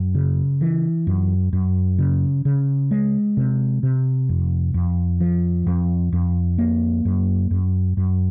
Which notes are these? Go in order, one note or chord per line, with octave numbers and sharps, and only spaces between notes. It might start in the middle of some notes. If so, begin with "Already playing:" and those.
Already playing: F#2
C#3
E3
F#2
F#2
C#3
C#3
G#3
C3
C3
F2
F2
F3
F2
F2
A#3
F#2
F#2
F#2